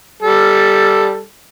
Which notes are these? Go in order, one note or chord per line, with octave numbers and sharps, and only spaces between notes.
G3 A4